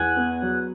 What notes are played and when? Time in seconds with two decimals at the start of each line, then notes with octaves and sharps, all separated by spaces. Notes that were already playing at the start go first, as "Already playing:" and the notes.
Already playing: E2 F#5 G#5
0.17 B3
0.42 F#3